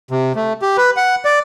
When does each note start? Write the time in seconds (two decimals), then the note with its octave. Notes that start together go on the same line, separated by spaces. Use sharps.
0.11 C3
0.35 A3
0.62 G4
0.78 B4
0.97 F#5
1.25 D5